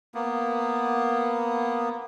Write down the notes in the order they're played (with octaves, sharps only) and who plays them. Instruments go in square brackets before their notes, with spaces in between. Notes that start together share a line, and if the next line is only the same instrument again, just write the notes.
[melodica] A#3 B3